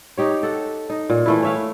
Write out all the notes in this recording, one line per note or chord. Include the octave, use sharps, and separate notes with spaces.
D#4 G4 C#5
A4 F#5
D#4
A#2
E3 A3 E4
C#5 E5 F5